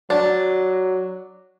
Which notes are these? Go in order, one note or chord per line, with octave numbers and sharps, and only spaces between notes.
F#3 D4